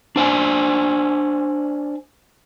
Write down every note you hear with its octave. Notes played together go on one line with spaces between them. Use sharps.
D4 C5 D5 G#5